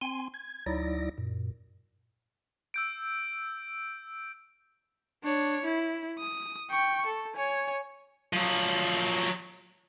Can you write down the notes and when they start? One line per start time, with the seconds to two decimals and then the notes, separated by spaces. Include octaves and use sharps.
0.01 C4 G#5 C6
0.34 G#6
0.66 D2 F#3 D#4 E4 D5 A#6
1.18 F#2 A#2
2.74 E6 G6 D7
5.24 D4 C#5
5.65 E4
6.19 D#6
6.71 G5 C#6
7.06 A4
7.36 C#5 G#5
8.33 F3 F#3